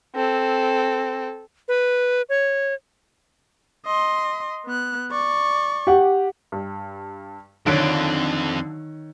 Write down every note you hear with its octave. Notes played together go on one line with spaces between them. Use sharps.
C4 A4
B4
C#5
D#5 C6
B3 F#6
D5 C#6
G4 F#5
G2
B1 F2 D3 D#3 C#5 F#6 D7